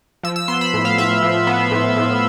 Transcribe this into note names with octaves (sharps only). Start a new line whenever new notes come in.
F3 E6
E6
B3 C6
B5
A2
F5
A2 E5
F3
B3
A2
A2